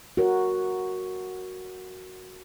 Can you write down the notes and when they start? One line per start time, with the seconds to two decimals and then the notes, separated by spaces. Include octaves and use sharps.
0.17 F#4 A#4 C#5